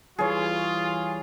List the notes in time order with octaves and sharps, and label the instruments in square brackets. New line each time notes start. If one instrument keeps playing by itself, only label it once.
[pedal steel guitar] E3 G3 [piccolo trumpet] F4 [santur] G#4 C#5